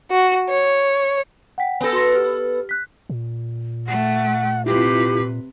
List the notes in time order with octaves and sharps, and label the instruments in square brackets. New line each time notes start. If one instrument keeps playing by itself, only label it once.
[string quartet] F#4
C#5
[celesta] F#5 G5 B6
[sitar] B3 A4 [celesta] G#5 G6 A#6
[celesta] F#4 C6 A#6
G4 F6
F#6 B6
[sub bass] A#2
[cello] A3 [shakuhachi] F#5
[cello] C3 B4 [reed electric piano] E4 F4 [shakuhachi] G4